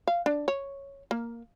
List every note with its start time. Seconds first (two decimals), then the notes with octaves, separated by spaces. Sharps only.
0.08 F5
0.26 D4
0.48 C#5
1.11 A#3